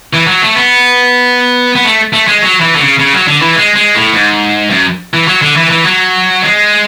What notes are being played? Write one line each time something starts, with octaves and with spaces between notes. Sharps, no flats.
E3
F#3
A3
B3
B3
A3
A3
G#3
F#3
E3
D3
C#3
C#3
F#3
D3
E3
G#3
G#3
A2
G#2
F#2
E3
F#3
D3
E3
E3
F#3
G#3